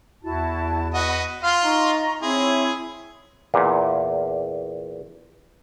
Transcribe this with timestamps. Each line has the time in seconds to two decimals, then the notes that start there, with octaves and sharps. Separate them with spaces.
0.23 E2 E4 F#4 A5
0.94 F#4 B4 D#5 F#5
1.43 F4 F5 C6 F6
1.63 D#4 D#5 A#5 C#6
2.22 C4 E4 G#4 C#5 C6
3.54 E2 A#2